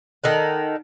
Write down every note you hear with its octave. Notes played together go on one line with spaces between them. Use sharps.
D#3 A4 F#5